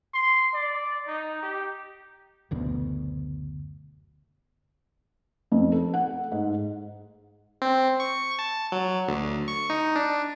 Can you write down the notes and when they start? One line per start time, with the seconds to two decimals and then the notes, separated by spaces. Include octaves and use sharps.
0.14 C6
0.54 D5
1.07 D#4
1.43 G4
2.51 F#1 D2 B2
5.52 F2
5.72 A4
5.94 F#5
6.32 G#2
7.62 C4
8.00 C#6
8.39 A5
8.72 F#3
9.08 D2
9.48 C#6
9.70 D#4
9.96 D4